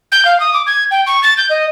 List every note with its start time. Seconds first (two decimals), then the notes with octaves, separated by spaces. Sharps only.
0.12 G6
0.25 F5
0.40 D#6
0.53 D6
0.67 G#6
0.91 G5
1.07 C#6
1.23 A6
1.37 G6
1.50 D#5